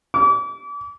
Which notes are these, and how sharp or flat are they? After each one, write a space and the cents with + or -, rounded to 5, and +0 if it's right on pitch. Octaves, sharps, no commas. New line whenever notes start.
D6 -35